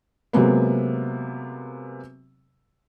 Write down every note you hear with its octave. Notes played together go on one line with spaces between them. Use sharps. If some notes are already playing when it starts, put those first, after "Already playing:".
C3 F#3 G#3 A#3 B3